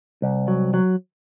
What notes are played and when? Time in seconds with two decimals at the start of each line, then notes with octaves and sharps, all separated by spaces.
0.22 C2
0.48 F#3
0.74 F#3